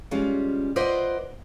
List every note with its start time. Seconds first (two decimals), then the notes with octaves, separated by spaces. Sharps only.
0.11 G3 G#3 C#4 F4
0.76 F4 B4 C5 D5 D#5 F#5